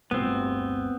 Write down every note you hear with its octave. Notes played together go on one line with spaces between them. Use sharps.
D1 G1 B3 C4